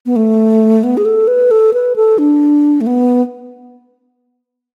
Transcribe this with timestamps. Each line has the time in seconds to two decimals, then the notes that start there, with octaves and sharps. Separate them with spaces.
0.06 B3
0.16 A3
0.83 B3
0.97 G#4
1.05 A4
1.28 B4
1.51 A4
1.74 B4
1.96 A4
2.18 D4
2.81 A3
2.87 B3